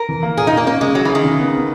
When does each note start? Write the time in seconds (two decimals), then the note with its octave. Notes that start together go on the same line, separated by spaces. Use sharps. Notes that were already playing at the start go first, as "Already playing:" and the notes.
Already playing: A#4
0.09 E3
0.23 A#3
0.37 A#2 G#4
0.47 D#4
0.52 A#2 A#3
0.66 A#3 C#4
0.81 C#3 G#3
0.95 F#3 G#4
1.05 E3
1.09 G#4
1.15 D#3
1.24 C#3
1.39 B3
1.54 B3